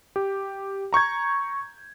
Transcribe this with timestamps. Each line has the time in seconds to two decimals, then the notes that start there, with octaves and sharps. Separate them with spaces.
0.16 G4
0.93 A#5 C#6 G6 G#6